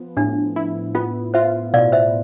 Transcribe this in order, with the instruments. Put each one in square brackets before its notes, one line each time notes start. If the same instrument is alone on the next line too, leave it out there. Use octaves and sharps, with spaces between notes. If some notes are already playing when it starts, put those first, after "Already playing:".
Already playing: [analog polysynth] F3 B3
[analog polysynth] A2 [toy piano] D4
[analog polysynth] E4
[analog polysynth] B3 [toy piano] F4
[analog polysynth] F4 [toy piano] C5 E5
[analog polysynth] B2 [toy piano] D5 F5
[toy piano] C5 E5